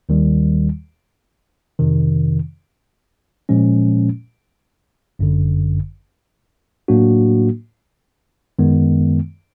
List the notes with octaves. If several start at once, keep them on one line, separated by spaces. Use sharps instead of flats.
D#2 D#3 G3
F2 C3 D#3
A#2 F3 G#3 C#4
G1 F#2 D3
A2 F#3 A#3 D4 F#4
F#2 D#3 G#3 B3